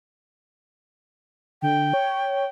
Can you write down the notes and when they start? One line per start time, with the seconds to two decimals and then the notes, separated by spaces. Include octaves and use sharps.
1.62 D3 G5
1.93 C#5